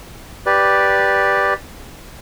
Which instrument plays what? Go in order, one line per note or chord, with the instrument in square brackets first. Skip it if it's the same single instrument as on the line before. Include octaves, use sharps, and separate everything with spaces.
[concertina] G4 B4 D5